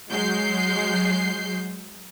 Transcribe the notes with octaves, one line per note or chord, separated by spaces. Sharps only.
F#3 G#3 G6 C7